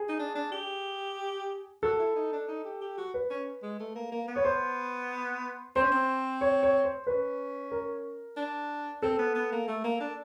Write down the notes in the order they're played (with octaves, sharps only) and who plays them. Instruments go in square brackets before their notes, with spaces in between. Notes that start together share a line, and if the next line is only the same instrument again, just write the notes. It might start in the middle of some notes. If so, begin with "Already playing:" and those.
Already playing: [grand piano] G#4
[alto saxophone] D#4
D4
D4
G4
[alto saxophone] F#4 [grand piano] A4
[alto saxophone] E4
D#4
D4
D#4
G4
G4
F#4
[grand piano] B4
[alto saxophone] C#4
G#3
A3
A#3
A#3
B3
[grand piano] C#5
C5
[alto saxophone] C4 [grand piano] C5
[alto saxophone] C#4
C4
[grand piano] C#5
C#5
C5
[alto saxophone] C#4 [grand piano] B4
[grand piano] A#4
[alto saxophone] D4
[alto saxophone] C4 [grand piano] A4
[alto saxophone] B3
B3
A#3
A3
A#3
D4